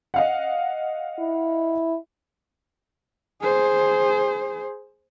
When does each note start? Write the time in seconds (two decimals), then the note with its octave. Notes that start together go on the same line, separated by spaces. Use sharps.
0.14 D#5 F5 F#5
1.19 E4
3.41 G#4 C5